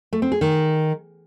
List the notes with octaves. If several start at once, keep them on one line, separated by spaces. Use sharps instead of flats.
A3
C4
G#4
D#3